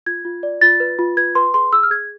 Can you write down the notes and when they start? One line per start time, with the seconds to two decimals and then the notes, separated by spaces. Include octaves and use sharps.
0.06 F4 G#6
0.25 F4
0.43 D5
0.61 F4 A6
0.80 B4
0.99 F4
1.17 B4 G#6
1.35 B4 C6
1.54 G#4 C6
1.73 G#4 E6
1.83 F6
1.91 G#4 G#6